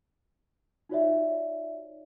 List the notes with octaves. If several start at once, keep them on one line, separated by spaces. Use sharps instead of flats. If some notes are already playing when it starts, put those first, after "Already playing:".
D#4 F4 F#4 C#5 D5 E5